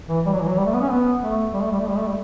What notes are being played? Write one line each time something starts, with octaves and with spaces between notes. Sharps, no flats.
E3
G3
F#3
E3
F#3
G3
A3
B3
C#4
B3
A3
G3
A3
G3
A3
G3
A3
G3